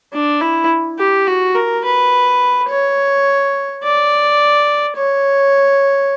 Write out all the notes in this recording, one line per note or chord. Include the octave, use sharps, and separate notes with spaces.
D4
E4
G4
F#4
A#4
B4
C#5
D5
C#5